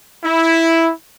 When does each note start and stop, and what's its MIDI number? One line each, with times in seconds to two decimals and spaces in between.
0.24 0.91 64